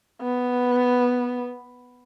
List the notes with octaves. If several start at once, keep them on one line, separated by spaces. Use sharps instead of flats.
B3